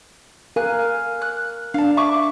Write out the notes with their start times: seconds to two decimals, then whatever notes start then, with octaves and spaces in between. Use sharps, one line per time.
0.56 A#4 F5 G#5 F#6
1.22 F#6
1.74 D4 F5 A5
1.97 E5 C#6 D6